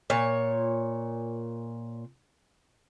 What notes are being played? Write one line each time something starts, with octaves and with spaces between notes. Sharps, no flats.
A#2 C#5